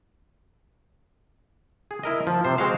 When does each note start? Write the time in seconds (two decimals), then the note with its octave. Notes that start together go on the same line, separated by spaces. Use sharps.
1.91 G#4
2.03 E4 A#4 D#5
2.27 F3
2.45 C3 C5
2.58 G#3 C4 F#4 C5 F5